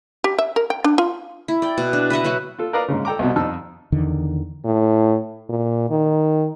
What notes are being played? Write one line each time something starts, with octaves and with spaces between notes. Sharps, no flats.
G4
E5
A#4
G5
D4
F4
E4
D5 G5
B2
D4
B4 D#5 E5 F#5
F#3 B3 F#4
F4 A4
A#4 B4 D5 D#5 F5 A#5
G#2 C#3
A4 G5 A#5 D6
C2 B2
F2 D#4 A5 E6
E2 D3 D#3
A2
A#2
D#3